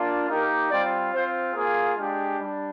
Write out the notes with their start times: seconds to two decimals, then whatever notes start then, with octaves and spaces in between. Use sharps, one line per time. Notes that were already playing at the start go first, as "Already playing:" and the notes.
Already playing: A#3 D4 F4
0.29 A#3 D#4 G4 A#4
0.71 G3 C4 F4 D5
1.13 C4 F4 C5
1.55 A#3 F4 G#4
1.97 G#3 D4 G4
2.39 G3 D4